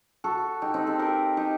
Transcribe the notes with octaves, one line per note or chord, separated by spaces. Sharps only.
F#4 A4
D#4 G4
C4 D#4
A4 C5
G4 A#4
D#4 G4